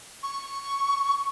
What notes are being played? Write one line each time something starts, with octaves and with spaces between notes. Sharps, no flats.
C#6